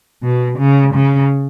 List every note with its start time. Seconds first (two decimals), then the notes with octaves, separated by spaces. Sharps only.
0.22 B2
0.58 C#3
0.94 C#3